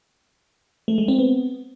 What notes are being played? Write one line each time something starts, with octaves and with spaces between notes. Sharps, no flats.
A3
G#3
C4
B3